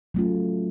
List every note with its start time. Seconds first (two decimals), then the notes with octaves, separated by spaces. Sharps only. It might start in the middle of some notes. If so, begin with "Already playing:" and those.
0.14 F#3 A3 C#4 F4